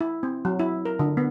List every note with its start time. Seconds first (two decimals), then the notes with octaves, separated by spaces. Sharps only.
0.01 E4
0.23 C4
0.45 F#3
0.59 E4
0.85 A#4
0.99 D3
1.17 B3